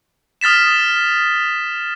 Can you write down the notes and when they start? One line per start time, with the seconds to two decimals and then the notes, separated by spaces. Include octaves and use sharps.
0.41 D#6 F6 A6 B6 E7